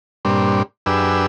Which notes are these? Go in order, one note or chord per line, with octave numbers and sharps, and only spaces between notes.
G2 A#2 G3 C4 D4
F#2 D4 G4 G#4 B4 E6